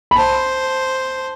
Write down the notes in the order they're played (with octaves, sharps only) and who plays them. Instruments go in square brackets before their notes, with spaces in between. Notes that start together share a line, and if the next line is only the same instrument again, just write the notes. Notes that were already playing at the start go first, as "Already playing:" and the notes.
[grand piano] B5
[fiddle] C5 [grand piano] A5